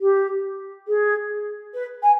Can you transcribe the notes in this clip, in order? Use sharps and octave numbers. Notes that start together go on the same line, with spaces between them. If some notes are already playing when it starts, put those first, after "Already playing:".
G4
G#4
B4
G#5